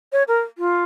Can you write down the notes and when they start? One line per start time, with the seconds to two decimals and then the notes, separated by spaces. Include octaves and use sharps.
0.13 C#5
0.28 A#4
0.58 F4